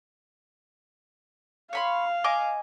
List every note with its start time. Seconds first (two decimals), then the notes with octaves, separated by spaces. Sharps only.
1.73 C#5 F5 B5 C6
2.24 D#5 G#5 D6